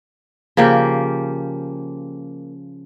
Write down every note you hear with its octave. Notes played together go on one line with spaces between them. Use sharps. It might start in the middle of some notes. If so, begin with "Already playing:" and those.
C#3 F3 A#3 G4